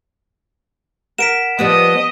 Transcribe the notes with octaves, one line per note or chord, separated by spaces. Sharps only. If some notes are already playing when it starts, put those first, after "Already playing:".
A#4 F#5 B6 D7 E7
F3 G3 B3 D#5